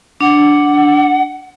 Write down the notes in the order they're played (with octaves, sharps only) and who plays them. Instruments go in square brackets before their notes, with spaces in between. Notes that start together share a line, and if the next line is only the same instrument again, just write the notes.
[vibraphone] D4 [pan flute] F#5